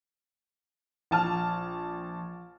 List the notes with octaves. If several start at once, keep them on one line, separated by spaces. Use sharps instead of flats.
A#1 A5 F6